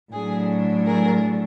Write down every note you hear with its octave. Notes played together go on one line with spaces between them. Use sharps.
A2 F#3 A3 D4 G#4
G#4 A#4